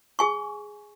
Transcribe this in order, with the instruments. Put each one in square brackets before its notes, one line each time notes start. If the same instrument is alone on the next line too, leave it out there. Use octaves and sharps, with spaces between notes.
[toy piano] G#4 G#5 C#6